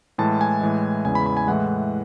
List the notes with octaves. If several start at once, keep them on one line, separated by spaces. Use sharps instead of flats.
A2 E3 G#3 A5
G#5
A2 E3 G#3
E2 C#3 E3 G#3 G#5
B5
B5
G#5
A2 E3 G#3 F#5